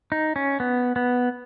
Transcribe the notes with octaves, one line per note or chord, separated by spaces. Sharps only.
D#4
C#4
B3
B3